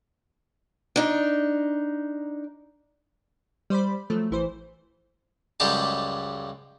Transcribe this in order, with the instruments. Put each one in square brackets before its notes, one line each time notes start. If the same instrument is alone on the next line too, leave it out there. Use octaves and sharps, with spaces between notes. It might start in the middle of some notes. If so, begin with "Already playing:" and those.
[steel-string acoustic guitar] D4 D#4
[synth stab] G3 C5 D5 B5
F3 F#3 A3
A1 E3 C5
[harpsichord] C#2 F#2 G3 G#3 G4 A5